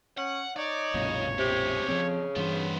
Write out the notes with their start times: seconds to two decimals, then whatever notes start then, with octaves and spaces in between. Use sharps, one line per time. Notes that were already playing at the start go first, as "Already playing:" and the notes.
0.18 C#4 F#5
0.56 D#4 C#5 D5
0.94 B1 F#2 A#2 C#3
1.39 C3 G4 G#4
1.88 C#3 F3 F#3 C4
2.36 G2 E3 B3 C5